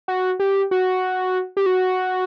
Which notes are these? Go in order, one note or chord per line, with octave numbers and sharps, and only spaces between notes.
F#4
G4
F#4
G4
F#4